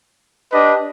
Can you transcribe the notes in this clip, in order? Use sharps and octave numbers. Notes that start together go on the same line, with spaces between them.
D4 G4 B4 D#5